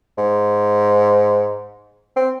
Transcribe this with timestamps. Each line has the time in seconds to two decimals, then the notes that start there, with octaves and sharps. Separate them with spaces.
0.18 G#2
2.16 C4